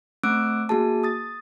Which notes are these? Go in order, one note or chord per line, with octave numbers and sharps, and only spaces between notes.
A3 C4 D6 E6 F#6 D7
A#3 F#4 G#4 A5
D#6 A6